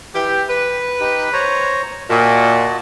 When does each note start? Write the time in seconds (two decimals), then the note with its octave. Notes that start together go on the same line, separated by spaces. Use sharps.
0.14 E3 G4
0.49 B4
1.00 D#4 G4
1.33 C5 C#5 A#5
2.10 A#2 F#4 D#5 A5